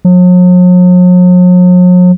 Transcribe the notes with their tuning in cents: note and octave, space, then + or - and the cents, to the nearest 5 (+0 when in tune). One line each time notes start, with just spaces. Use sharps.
F#3 -45